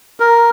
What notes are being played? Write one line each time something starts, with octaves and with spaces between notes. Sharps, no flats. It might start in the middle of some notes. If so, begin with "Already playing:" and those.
A#4